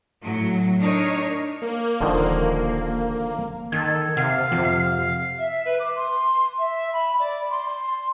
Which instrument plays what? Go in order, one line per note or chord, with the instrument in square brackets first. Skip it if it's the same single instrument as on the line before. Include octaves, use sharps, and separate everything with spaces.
[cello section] A2 F#3
D4 D#4 A#4 C#5
[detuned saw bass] A#3
[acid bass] D#1 [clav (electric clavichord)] D3 D#3 F3
[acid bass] D#3 [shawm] A4 [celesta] G#6
[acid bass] C3 [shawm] F5 [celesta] F#5
[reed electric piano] F2 F3 [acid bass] C3
[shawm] F5
[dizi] E5
B4
D6
C6
E5
B5
D5
C6
C6